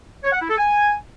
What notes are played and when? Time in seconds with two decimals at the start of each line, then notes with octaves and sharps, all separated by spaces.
0.24 C#5
0.32 F#5
0.41 E4
0.50 A4
0.58 G#5